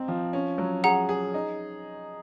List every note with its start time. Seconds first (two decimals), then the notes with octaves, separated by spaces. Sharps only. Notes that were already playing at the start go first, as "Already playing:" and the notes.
Already playing: C4 D#4
0.08 F3
0.33 C#4
0.58 F#3
0.83 G#4 F#5 A#5
1.09 G#4
1.34 D#4